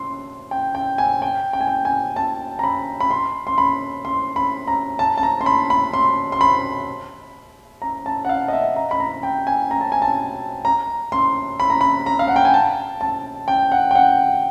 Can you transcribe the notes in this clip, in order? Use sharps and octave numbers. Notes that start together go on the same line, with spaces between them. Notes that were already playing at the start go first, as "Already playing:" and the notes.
Already playing: C6
G5
G5
G#5
G5
G5
G#5
G5
G#5
A5
A#5
B5
B5
C6
C6
B5
C6
B5
A#5
A5
A5
A#5
C6
B5
B5
C6
C6
B5
A#5
A5
F#5
F5
D#5
E5
A#5
B5
A#5
G5
G#5
A#5
A5
G#5
A5
A#5
C6
B5
A#5
B5
A#5
F5
F#5
G5
G#5
A5
A5
G5
F#5
G5
F#5